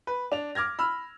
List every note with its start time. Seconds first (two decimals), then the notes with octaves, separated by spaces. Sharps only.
0.07 B4
0.32 D4 F7
0.55 D6 F6 G#6 A#6
0.79 B5 E6 F6